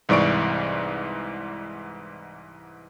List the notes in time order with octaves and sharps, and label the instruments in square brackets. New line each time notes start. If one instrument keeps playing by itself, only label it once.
[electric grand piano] C2 G#2 E3 D5 C#6 D7